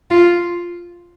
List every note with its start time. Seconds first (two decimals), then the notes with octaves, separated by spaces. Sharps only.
0.11 F4